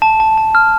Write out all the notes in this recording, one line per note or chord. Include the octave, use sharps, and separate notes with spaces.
A5
A5
A5
F6